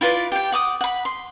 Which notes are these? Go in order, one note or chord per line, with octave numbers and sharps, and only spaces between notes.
E4 F4 B4 D5
G4 G5
F#5 D6 D#6
F#5 B5
C6